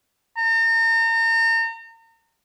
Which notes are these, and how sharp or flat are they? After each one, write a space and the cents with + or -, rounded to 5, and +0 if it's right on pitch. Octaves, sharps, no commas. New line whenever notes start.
A#5 -40